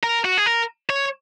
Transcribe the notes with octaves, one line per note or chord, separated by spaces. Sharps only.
A#4
F#4
G#4
A#4
C#5